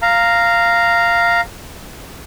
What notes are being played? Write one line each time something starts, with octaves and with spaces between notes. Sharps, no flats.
F5 A#5